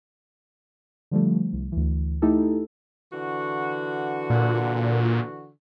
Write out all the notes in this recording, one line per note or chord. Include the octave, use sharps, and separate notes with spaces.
D3 F3 G3 A3
C2
D2 E3
A3 D#4 E4 G4 A4
D3 E3 F#4
A#2